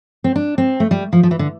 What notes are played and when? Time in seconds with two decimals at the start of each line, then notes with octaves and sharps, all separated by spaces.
0.24 C4
0.36 D4
0.58 C4
0.80 A3
0.91 G3
1.13 F3
1.23 F3
1.31 E3
1.39 D3